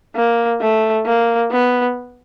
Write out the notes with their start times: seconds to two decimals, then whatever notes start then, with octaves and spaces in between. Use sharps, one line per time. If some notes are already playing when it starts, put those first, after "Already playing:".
0.16 A#3
0.61 A3
1.06 A#3
1.52 B3